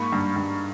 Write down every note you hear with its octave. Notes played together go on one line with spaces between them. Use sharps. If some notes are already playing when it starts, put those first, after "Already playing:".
Already playing: G#2 A#3 B5 C#6
G2
G2